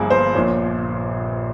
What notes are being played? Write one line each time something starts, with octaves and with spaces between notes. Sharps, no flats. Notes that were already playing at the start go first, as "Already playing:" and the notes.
Already playing: G1 G2 F3 A#3 G#4
C5
A#1 A#2 F3 C#5